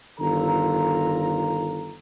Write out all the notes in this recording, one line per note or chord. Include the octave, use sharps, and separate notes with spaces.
G1 D#3 F4 A4 A#5